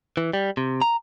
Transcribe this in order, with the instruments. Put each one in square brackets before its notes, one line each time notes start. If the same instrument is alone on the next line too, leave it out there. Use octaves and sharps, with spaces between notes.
[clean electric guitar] E3
G3
C3
A#5